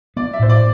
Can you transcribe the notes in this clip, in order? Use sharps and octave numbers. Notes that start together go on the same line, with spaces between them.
B3 D5
E5
A2 C5
D5